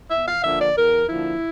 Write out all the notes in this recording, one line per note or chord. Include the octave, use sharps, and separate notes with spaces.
E2 E5
F5
D3 F3 A#3 E5
D5
E2 A#4
D3 F3 A#3 E4